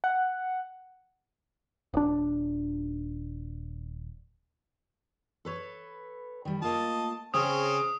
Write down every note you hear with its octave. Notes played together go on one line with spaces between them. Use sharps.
F#5
D#1 D4
A4 B4 C#5
D#3 G3
A3 A#3 F4 D#5 A5
C#3 C4 C#4 G#4 A#5 D#6